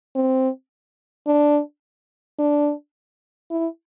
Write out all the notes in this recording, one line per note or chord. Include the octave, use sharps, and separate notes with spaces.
C4
D4
D4
E4